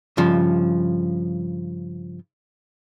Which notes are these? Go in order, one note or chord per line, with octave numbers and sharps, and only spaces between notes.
G2 C#3 F3